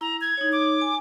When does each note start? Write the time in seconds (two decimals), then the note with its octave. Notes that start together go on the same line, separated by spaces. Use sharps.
0.01 E4 A#5
0.21 G#6
0.37 D#4 C#5
0.52 D6
0.81 G#5